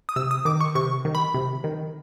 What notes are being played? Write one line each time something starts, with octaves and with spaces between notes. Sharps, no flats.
D#6
C3 E6
D#6
D#3 D6
C#6
C3 C#6
D#3
B5
C3
D#3